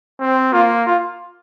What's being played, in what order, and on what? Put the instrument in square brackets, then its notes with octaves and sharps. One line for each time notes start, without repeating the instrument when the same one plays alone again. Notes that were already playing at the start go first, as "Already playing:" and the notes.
[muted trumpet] C4
[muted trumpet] A#3 [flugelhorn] F4
[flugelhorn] F4